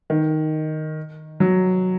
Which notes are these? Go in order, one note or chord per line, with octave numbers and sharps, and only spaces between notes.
D#3
F#3